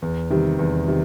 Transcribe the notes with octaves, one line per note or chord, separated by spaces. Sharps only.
E2
C3 D#3 G3
E2
C3 D#3